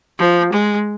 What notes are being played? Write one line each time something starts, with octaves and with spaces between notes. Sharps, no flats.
F3
G#3